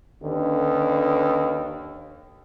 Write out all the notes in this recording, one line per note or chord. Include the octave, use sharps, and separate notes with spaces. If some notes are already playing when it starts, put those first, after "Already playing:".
D#2 D3 C#4 B4